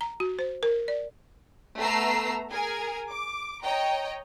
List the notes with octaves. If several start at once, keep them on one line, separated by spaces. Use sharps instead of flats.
A#5
F#4
C5
A#4
D5
A3 B3 A#5 E6 C7
G#4 A#4 G#5
D6
C#5 D#5 G5 A#5